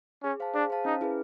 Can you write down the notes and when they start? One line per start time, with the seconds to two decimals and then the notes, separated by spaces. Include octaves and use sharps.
0.23 C#4 G#4
0.40 C5 F5 A5
0.55 D4 G#4
0.70 C5 F5 A5
0.85 C#4 D#4
1.01 E4 G#4 B4